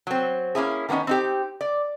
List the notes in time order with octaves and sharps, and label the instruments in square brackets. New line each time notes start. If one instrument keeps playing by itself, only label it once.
[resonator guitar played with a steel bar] F#3 C4
A#3 C#4 E4 G#4
D#3 A#3 B3 C#4 D#4
C4 D#4 G4
D5